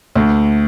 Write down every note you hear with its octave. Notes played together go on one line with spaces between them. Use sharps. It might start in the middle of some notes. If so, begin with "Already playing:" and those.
D2